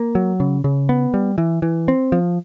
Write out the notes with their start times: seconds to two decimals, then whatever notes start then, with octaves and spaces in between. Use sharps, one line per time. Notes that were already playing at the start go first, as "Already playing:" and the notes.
Already playing: A#3
0.15 F#3
0.40 C#3
0.64 C#3
0.89 B3
1.14 G3
1.38 E3
1.62 E3
1.88 C4
2.12 F3